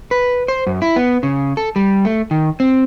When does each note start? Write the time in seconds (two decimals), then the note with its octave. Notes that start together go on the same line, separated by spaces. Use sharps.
0.11 B4
0.48 C5
0.67 F#2
0.82 E4
0.96 B3
1.23 C#3
1.57 A4
1.76 G3
2.05 A3
2.31 D#3
2.60 C4